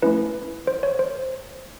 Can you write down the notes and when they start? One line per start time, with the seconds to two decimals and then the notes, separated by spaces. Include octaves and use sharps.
0.02 A3 C#4 E4 B4
0.67 C5
0.83 C#5
0.99 C5